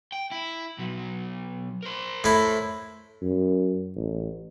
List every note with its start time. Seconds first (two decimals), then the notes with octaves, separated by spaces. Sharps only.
0.12 G5
0.32 E4
0.78 B1 F#3
1.83 A#4 C5
2.24 A2 E4
3.22 F#2
3.96 A1